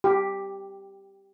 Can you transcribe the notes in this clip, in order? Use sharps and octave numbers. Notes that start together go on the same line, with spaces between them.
G4